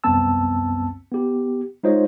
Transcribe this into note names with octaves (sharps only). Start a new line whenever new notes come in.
C2 F#2 B3 C4 A5 E6
B3 G4
G#3 D#4 F4 C5 C#5 D#5